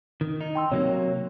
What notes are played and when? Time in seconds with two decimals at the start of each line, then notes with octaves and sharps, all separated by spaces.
0.21 D#3
0.41 D#4
0.55 G5 C6 E6
0.72 C3 F#3 A#3 C#5